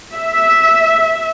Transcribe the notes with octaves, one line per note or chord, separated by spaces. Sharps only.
E5